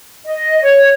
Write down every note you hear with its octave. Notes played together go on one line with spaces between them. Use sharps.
D#5
C#5